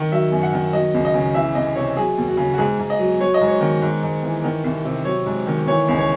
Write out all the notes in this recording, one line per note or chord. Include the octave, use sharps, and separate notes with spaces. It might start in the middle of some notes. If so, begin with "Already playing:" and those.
Already playing: D#3
F#3 E5
F#2
F#5
D#3
F#3 D#5
C#2
D#5
C#3
E3 E5
C2 D#5
C3 C#5
F#3 G#4
D#2
F#4
C#3
F#4
G#2 G#4
G#2
D#5
F#3
F#3 C#5
D#5
G#2
C#5
D#3
G#2
G#2
E3
D#3
C2
C3
F#3 C#5
G#2
D#3
E3 C#5
C#2
C#5